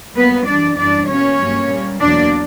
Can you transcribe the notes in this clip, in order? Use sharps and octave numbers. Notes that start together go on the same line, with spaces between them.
G2 F#3 A#3 B3 B4
F#2 E3 G3 D4 D5
F#2 E3 G3 D4 D5
B2 A#3 C#4 C#5
G2 F#3 A#3
A#2 G3 A#3
E2 B2 F#3 A#3 D4 D5